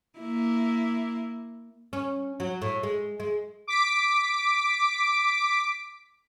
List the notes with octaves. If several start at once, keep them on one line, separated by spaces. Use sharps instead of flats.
A#3 E4
C#4
F#3
A2
G#3
G#3
D6 B6 D7